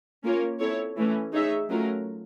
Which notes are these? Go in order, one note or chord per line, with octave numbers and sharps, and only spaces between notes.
A#3 C#4 F4 A#4 C#5
C4 E4 A4 C#5
E3 A3 C#4
D#4 G#4 C#5 E5
F#3 A3 C#4 F4 A#4